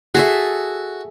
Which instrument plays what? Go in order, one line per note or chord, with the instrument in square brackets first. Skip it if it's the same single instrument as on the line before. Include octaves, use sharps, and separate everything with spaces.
[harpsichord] F#4 [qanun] G#4 A4 E5